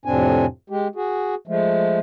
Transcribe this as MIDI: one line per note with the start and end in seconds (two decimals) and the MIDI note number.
0.05 0.46 41
0.05 0.46 45
0.05 0.46 48
0.05 0.46 60
0.05 0.46 62
0.05 0.46 80
0.70 0.88 56
0.70 0.88 67
0.95 1.35 66
0.95 1.35 68
1.47 1.99 53
1.47 1.99 56
1.47 1.99 57